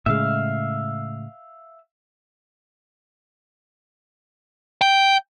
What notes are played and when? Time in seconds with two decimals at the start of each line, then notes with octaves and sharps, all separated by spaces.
0.06 A2 C#3 G#3 E5 F5
4.81 G5